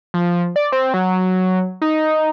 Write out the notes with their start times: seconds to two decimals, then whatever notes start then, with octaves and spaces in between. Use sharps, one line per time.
0.14 F3
0.56 D5
0.72 C4
0.94 F#3
1.82 D#4